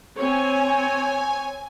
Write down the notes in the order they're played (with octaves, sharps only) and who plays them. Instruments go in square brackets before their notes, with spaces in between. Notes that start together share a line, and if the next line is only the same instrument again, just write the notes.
[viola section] C4 C#5 [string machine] G#5